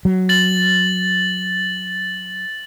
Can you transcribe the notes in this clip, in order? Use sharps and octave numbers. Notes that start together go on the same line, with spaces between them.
F#3
A6 F#7